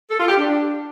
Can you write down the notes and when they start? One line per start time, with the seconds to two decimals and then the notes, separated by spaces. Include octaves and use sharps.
0.11 A4
0.20 F4
0.29 G4
0.38 D4